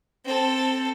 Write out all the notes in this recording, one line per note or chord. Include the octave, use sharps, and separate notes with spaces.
C4 A4